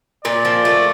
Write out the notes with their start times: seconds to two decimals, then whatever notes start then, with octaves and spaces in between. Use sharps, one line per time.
0.25 A#2 D5
0.45 F3
0.65 A3